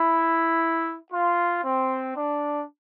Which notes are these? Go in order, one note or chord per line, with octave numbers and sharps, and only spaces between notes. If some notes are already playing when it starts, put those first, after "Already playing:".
Already playing: E4
F4
C4
D4